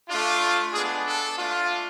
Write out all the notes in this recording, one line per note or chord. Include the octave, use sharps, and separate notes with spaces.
A3 D4 F4
G#3 B3 D4 G#4
A4
A3 D4 F4